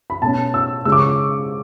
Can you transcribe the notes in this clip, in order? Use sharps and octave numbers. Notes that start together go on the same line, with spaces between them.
B5
B2 A3 C#4 A5
E6
C#3 G#3 C#4 E6
D6
C#6